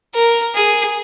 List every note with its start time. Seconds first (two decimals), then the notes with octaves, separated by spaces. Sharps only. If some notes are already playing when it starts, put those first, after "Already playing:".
0.14 A#4
0.55 G#4